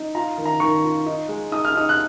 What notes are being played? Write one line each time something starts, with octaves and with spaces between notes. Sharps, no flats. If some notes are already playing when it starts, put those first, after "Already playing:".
Already playing: D#4
F4 A#5
D#3
A#5
D#3 C#6
F4
D#4
G#3
D#4 D#6
F6
D#4 D#6
F#6